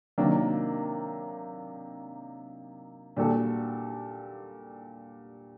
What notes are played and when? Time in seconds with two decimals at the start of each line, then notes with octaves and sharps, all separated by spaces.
0.18 C3 D#3 F#3 A#3 D4
3.17 A#2 G3 D4 F#4 A4